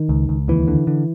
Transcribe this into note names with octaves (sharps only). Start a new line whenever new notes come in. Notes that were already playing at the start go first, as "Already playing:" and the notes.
Already playing: D#3
C#2
C#2
D#2 E3
D3
D3